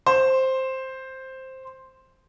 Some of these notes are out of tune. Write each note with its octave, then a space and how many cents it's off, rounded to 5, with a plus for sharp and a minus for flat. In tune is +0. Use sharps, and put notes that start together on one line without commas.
C5 +5